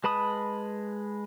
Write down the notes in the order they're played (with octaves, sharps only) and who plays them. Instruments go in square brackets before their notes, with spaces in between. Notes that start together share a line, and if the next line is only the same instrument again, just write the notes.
[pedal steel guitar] G#3 B4 A5 B5 D#6